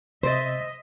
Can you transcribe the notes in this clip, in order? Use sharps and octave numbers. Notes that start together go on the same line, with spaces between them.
C3 C5 D#5 E5 A6